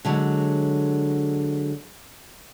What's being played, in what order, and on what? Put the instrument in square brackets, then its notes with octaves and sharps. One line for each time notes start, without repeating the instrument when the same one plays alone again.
[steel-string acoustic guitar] D3 F#3 G#3